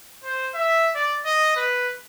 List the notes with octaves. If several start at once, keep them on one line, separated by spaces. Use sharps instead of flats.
C5
E5
D5
D#5
B4